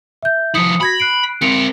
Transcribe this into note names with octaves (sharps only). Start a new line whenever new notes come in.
E5 G6
F3 E4 D#6 C#7
F#4 B5 G#6 A#6
F#6 C7 D7
C4 A#4 C#7 D7 F7